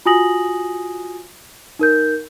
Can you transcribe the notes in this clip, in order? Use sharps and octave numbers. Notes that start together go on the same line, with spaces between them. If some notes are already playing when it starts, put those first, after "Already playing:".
F4 F#4 G#5 D#6 A#6 F#7
D#4 A#4 G6